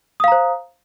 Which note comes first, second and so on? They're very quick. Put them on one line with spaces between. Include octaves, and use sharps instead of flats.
D#6 F5 A#5 C5